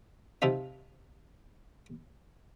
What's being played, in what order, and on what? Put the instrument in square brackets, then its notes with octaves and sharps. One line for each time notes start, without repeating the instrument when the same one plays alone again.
[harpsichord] C3 F3 D#4 F4 E5